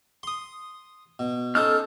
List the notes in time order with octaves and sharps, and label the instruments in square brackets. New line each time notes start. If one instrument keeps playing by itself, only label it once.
[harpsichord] C6 D#6
B2
[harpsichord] C#4 D#4 C5 [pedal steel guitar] A4 E6 F6